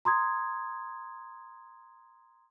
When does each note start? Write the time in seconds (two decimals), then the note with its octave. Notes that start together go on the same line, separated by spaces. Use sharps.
0.05 A#5 C6 D#6 G#6